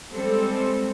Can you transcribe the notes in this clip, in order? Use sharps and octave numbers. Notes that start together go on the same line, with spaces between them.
G3 G#3 C4 A4